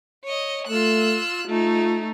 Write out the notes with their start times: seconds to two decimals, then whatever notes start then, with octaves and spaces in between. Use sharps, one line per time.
0.25 C#5 D#5
0.69 A3 F4 E6 F#6
1.48 A3 D#4 F4